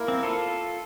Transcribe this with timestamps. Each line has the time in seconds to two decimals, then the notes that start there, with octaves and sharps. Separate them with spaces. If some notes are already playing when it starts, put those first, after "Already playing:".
Already playing: A#3 E4 A#4
0.08 C4
0.23 F4 A4